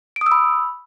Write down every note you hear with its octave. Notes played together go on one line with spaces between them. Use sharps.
D7
D#6
E6
B5